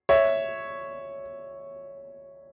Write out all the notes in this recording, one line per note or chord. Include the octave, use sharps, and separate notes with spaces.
C#5 E5